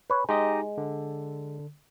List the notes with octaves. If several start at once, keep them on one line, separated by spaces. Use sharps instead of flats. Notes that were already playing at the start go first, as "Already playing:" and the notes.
B4 C#5
G#3 D#4 G4 D#5
D3